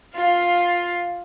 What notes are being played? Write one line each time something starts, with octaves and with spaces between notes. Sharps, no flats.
F4 F5